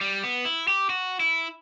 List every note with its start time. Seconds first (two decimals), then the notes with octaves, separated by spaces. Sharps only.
0.01 G3
0.23 B3
0.45 E4
0.68 G4
0.90 F#4
1.20 E4